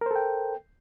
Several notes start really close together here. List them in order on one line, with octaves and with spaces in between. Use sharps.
A#4 C5 A4 G5